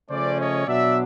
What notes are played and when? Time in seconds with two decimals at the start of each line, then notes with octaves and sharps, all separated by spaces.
0.11 C#3 F3 A3 C#4 C5 D5
0.38 C#5 D#5
0.66 B2 F#3 B3 D4 D5 E5